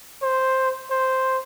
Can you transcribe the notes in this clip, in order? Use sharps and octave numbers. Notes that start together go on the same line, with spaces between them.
C5
C5